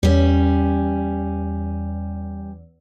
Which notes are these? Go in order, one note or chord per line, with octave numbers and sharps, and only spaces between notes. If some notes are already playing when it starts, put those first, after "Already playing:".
E2 G3 C#4